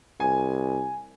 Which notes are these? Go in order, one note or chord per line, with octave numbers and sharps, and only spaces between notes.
C2 G#5